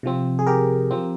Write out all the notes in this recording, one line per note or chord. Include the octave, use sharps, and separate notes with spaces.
C3 F3 C4
G#4
G4 A#4
F3 C4